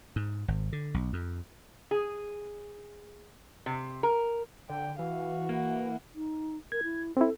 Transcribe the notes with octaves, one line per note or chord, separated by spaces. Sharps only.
G#2
G#1
D3
B1
F2
G#4
C3
A#4
D3 G5
E3 F#4 F5
A#3 E4 F#5
D#4
A#4 G#6
E4
C4 E4 A4